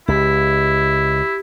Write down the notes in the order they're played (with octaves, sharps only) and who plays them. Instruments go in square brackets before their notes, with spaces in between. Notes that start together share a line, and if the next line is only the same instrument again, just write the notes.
[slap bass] C#2 [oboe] E4 [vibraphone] G4